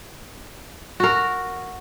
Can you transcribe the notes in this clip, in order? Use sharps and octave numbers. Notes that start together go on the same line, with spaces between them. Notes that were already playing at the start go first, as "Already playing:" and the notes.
F#4 A#4